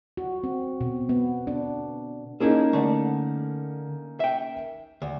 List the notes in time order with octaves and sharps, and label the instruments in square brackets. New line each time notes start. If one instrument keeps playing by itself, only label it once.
[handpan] F#4
C4
B2
B3
D4
[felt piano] A#3 C#4 D#4 [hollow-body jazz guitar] E4 G#4 A4
[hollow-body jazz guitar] D3 A3
E5 G5
D2